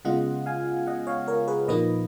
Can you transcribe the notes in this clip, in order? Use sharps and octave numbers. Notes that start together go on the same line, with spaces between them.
C#3 G#3 B3 F4 D#5 F#5
F5 G#5
D#5 F#5
C#5 F5
A#4 C#5
G#4 B4
A#2 F3 A#3 D#4 B4 D#5